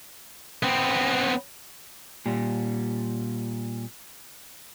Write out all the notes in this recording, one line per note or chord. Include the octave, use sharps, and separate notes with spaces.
B3 C4
A#2 G3